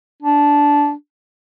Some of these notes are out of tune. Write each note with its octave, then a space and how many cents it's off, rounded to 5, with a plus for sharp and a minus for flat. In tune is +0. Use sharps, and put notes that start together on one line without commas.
D4 -15